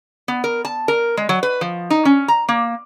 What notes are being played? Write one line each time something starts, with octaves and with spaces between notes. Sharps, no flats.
B3
A#4
A5
A#4
G#3
F#3
B4
F3
D#4
C#4
A#5
A#3